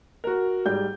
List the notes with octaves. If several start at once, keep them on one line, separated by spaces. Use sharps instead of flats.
F#4 A#4
G#2 G3 G5 G6